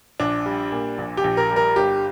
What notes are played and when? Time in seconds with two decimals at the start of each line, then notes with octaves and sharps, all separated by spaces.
0.20 A#1 D4
0.46 G3
0.72 A#2
0.98 A#1
1.17 G4
1.24 A#1
1.37 A#4
1.50 G3
1.56 A#4
1.76 G1 G4